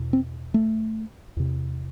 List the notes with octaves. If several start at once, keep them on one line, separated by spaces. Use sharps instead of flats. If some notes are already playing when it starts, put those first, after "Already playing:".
Already playing: E2 B2
C4
A3
E2 C3